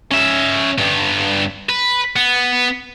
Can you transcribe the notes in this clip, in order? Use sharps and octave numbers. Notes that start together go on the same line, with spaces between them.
C#4 E5
G2 B3
B4
B3